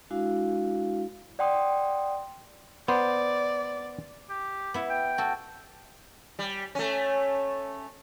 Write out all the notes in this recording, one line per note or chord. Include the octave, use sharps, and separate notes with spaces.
G#3 D4 E4 F#4 F5
D5 F#5 G5 C6 D#6
B3 C5 D5
G4
B3 E4
G5
F#4 A4
G3
A3 C#4